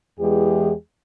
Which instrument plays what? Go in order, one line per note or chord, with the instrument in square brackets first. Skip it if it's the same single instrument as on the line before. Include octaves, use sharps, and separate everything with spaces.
[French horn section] E2 E3 G#3 G4 G#4